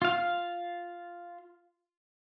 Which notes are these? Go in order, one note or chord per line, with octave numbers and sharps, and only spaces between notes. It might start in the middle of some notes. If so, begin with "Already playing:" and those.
F4 F5